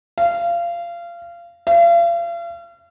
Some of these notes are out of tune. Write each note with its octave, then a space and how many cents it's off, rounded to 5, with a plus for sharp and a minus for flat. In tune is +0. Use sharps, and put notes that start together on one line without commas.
F5 -25
F5 -40